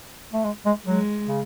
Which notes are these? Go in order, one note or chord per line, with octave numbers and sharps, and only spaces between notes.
A3
G#3
G#3
F#3 G#3
C#3